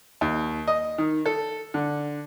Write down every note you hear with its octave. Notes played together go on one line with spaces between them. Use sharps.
D#2
D#5
D#3
A4
D3